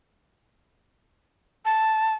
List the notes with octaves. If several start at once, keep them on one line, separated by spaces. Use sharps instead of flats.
A5